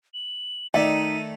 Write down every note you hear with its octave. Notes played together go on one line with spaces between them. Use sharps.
F#7
D#3 A3 D#4 D5 E5 D#7